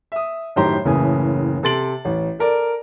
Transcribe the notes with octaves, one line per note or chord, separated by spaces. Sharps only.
E5 D#6
F#2 A2 D#3 G4 C5 A#5
F#1 A2 C#3 E3 G#5 D#6
C3 A4 C6 A6 D7 F#7
A1
A4 A#4 D5